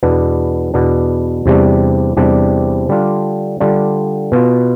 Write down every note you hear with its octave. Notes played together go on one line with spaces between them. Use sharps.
E2 B2 B3 D4
E2 B2 B3 D4
E2 C3 G3 D4
E2 C3 G3 D4
D3 G3 D4 F4
D3 G3 D4 F4
B2 B3 F4